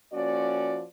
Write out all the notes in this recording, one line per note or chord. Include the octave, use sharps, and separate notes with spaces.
F3 A#3 C#4 F#4 D5